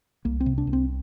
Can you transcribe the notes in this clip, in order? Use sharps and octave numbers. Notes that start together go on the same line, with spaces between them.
C2 A#3
C4
C3
D4
C2
C4